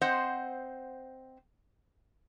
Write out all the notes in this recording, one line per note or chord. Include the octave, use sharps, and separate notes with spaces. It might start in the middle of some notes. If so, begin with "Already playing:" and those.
C4 C5 D#5 F#5